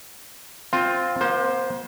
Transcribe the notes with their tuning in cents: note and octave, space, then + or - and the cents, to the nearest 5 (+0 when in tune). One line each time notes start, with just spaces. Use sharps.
C4 +0 F4 +10
A#3 +45 C5 +0